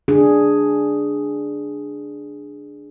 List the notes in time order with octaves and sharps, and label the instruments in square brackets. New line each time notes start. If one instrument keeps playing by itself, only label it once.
[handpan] D4 G#4